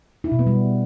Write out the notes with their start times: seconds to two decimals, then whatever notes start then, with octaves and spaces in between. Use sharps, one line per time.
0.24 E4
0.32 B2
0.39 B3
0.47 G3